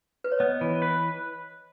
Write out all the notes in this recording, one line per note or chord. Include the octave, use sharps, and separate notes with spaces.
B4
C#5
B3 D#5
E3
B4